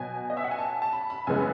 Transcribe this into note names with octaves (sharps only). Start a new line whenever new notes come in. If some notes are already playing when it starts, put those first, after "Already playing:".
Already playing: B2 F#3 B3 G#5
D#5
E5
F#5
G#5
A5
A5
B5
B5
F#2 C#3 E3 G#3 B3 G#5